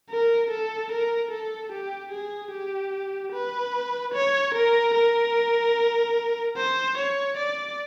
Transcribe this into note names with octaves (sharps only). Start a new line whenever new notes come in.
A#4
A4
A#4
A4
G4
G#4
G4
B4
C#5
A#4
A#4
C5
C#5
D5